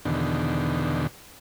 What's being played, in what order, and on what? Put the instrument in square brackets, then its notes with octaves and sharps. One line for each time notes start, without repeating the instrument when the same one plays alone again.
[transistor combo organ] E2 B2 D3 D#3